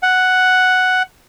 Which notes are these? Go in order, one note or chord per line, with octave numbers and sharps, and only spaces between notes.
F#5